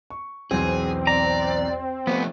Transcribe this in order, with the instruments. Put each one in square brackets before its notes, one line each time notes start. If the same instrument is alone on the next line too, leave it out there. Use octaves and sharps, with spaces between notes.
[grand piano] C#6
[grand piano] B1 E2 [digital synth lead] C4 [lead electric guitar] G#4
[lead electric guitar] D5 [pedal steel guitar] A#5
[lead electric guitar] F3 A3 [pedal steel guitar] B3